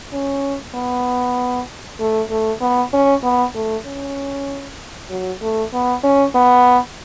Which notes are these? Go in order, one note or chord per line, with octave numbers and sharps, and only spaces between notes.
C#4
B3
A3
A3
B3
C#4
B3
A3
C#4
F#3
A3
B3
C#4
B3